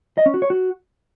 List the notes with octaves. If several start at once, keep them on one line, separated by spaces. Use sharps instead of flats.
D#5
C#4
F#4
C#5
F#4